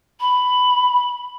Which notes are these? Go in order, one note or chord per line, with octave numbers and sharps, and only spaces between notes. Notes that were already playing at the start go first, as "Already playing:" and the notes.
B5